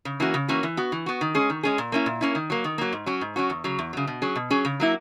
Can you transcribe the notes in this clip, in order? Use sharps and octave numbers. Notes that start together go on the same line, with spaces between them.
C#3
E3 A#3 C#4 F#4
C#3
E3 A#3 C#4 F#4
E3
B3 F#4
E3
B3 F#4
D#3
G#3 C#4 G#4
D#3
G#3 C#4 G#4
A#2
A#3 C#4 E4
A#2
A#3 C#4 E4
D#3
F#3 A#3
D#3
F#3 A#3
G#2
F#3 C#4 F#4
G#2
F#3 C#4 F#4
E2
C#3 F#3
E2
C#3 F#3
B2
F#3 C#4 G#4
B2
F#3 C#4 G#4
C#3
F#3 A#3 E4